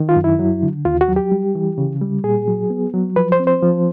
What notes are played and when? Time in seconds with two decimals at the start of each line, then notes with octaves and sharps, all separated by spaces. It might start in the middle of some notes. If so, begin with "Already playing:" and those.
Already playing: D#3
0.09 F4
0.16 F#2
0.24 E4
0.39 F#3
0.63 D3
0.85 D#2 F4
1.01 F#4
1.09 F#3
1.16 G4
1.32 G3
1.55 E3
1.78 C#3
2.01 G3
2.24 A#2 G#4
2.47 F#3
2.70 B3
2.94 F#3
3.16 F3 B4
3.32 C5
3.40 C4
3.47 C5
3.62 F3